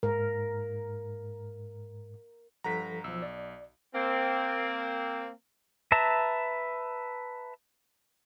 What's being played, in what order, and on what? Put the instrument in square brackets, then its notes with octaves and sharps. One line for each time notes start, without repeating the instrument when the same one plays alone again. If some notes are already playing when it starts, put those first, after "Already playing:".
[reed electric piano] G#2 [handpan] A#4
[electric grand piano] G2 F#5 A#5 [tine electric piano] F3 A4 B6
[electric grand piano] B1 [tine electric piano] F3 E6
[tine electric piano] D5
[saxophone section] A#3 C4
[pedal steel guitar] B4 E5 A5 A#5